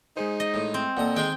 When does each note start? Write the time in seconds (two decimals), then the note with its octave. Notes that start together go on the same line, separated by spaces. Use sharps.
0.17 G#3 D#4 G#4 C5
0.40 D#5
0.54 A2
0.74 C4
0.97 A#2 A4 D#5 F#5 D#6
1.16 D#3 G#3 G5 G#5 C6